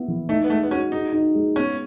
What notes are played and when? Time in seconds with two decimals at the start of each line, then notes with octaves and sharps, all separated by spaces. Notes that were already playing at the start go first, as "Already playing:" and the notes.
Already playing: B3 E4
0.08 E3
0.29 A3 D#4
0.44 B3
0.50 G#3 A3
0.63 B3
0.71 C#4 F#4
0.92 D#4 G#4
1.13 D#4
1.35 G#3
1.56 B3 C#4